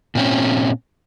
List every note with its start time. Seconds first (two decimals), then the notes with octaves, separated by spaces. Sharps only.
0.15 A#2 C4 C#4